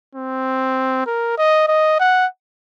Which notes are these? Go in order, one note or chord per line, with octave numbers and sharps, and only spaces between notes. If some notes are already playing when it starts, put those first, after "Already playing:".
C4
A#4
D#5
D#5
F#5